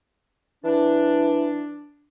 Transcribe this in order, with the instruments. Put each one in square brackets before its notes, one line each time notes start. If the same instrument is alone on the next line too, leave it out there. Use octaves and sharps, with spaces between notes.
[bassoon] E3 [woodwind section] D4